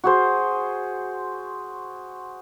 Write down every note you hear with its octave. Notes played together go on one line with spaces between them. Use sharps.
F#4 G#4 C5